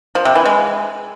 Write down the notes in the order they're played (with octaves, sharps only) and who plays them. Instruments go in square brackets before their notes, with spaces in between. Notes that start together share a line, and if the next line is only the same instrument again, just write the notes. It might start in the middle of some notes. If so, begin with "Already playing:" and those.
[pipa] F3
C3
E3
G#3